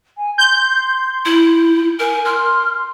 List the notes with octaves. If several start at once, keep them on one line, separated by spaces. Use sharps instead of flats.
G#5
C6 G6
E4
A#4 G#5
C6 F6